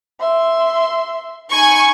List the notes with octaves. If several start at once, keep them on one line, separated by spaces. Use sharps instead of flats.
E5 C6
D#4 G#5 B5 C#6